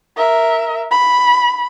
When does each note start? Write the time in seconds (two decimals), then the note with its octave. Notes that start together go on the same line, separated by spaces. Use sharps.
0.17 A#4 E5
0.91 B5